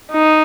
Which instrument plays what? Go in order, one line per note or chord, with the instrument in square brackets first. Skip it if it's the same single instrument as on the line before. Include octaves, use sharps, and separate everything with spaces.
[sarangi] D#4